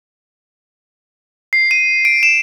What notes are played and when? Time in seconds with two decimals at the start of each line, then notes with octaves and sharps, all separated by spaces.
1.53 C7
1.71 D#7
2.05 D7
2.23 E7